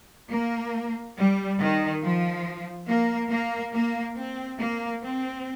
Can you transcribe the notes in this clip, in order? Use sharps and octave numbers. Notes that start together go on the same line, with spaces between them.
A#3
G3
D#3
F3
A#3
A#3
A#3
C4
A#3
C4